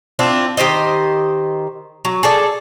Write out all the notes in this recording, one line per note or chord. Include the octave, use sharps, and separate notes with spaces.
C4 D4 E4 F4
D#3 G4 C5 D#5
F#3
G#4 A4 D5